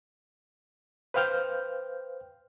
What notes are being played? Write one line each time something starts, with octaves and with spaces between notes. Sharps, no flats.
B4 C5 F5 G5 F6 G6